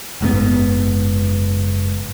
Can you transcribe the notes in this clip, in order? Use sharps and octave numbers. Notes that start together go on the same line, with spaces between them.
F#1 G#2 B2 B3